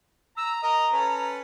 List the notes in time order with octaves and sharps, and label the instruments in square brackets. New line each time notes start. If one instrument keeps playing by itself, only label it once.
[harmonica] A#5 [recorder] E6
[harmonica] A#4 D#5 [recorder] A#5
[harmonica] C#4 A4 B4